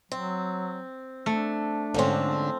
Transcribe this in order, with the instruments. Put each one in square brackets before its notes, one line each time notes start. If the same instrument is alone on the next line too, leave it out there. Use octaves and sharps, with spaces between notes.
[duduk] F#3 [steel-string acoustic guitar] C4
[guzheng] A3 [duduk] D4
[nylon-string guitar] G#2 D3 C#4 [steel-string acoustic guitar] F3 C4